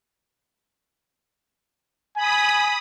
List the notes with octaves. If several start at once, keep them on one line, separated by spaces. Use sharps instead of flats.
G#5 B5 D#6